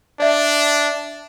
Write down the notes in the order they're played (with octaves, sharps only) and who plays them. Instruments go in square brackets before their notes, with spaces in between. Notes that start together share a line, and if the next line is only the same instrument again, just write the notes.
[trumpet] D4 [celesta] D5 E5